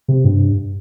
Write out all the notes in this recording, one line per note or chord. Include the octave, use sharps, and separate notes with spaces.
C3
G2